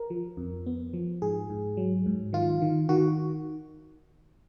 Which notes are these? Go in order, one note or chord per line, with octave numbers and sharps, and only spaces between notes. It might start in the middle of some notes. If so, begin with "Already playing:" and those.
Already playing: A#4
F3
F2
B3
F3
G#2 G#4
G#2
F#3
G#2
D#3 F4
D#3
D#3 F#4